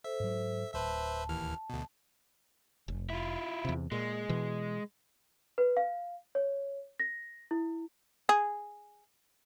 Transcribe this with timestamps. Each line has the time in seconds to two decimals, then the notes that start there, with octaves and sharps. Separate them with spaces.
0.04 A4 C5 E5
0.20 G#2 F#3
0.74 D1 B4 C5 E5 A5
1.29 D#2 E3 F6
1.70 D2 B2
2.88 F1
3.10 E4 F4
3.65 E2 C3
3.92 A#2 G#3
4.29 B2 E3
5.58 B4
5.77 F5
6.35 C#5
7.00 A#6
7.51 E4
8.29 G#4